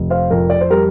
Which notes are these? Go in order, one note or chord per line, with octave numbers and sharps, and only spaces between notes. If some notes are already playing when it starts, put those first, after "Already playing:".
Already playing: F1
C5 F5
F2 A#4
D5
C5
G3 A#4